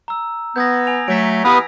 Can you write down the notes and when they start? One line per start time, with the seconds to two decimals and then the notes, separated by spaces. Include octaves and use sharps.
0.08 A#5 E6
0.56 B3 G6 G#6 A#6
0.87 G#5 F7
1.08 F#3 A3 B6 D7
1.44 E3 B3 G4 B4 F5 D#6